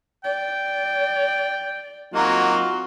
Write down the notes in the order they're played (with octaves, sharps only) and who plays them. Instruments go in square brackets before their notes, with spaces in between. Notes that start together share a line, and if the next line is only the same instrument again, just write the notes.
[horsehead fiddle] D5 [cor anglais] G5
[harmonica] F#3 A#3 D#4 [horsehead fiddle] C4 [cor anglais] F4 [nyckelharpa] F#4